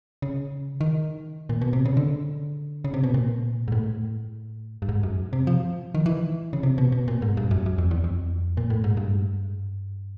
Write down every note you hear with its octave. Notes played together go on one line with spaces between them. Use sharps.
C#3
D#3
A#2
B2
C3
C#3
D3
C#3
C3
B2
A#2
G#2
A2
G2
G#2
F#2
C3
F3
D#3
E3
C#3
C3
B2
B2
A#2
G#2
G2
F#2
F#2
F2
E2
F2
A#2
A2
G#2
G2